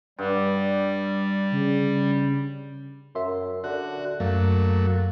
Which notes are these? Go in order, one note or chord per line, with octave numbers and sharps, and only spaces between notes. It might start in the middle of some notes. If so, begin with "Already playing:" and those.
G2 G3
C#3
F#2 A#4 E5 C6
D3 F#4
F#2 F#3 A3 A#3